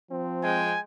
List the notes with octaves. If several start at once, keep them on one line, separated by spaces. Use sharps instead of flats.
F3 C4
G#3 G5 G#5